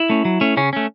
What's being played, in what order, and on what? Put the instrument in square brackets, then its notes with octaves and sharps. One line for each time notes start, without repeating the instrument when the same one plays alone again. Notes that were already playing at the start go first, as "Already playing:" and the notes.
Already playing: [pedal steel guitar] E4
A3 C#4
F#3
A3 C#4
C#3 C#4
A3 C#4